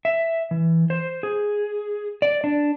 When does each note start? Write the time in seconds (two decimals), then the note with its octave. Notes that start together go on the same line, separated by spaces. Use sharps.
0.05 E5
0.51 E3
0.90 C5
1.23 G#4
2.22 D5
2.44 D4